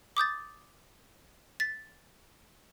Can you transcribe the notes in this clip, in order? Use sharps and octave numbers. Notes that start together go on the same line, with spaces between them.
D6 D#6 G6 A6
A6 B6